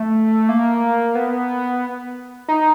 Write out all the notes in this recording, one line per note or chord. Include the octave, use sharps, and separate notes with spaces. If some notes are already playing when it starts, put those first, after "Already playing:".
Already playing: A3
A#3
B3
D#4